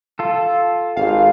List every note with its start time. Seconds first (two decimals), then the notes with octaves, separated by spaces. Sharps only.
0.19 F4 A4
0.96 G#1 F5